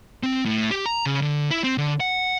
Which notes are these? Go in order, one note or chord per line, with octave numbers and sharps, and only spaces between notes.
C4
A2
G4
A#5
C#3
D3
E4
C4
D3
F#5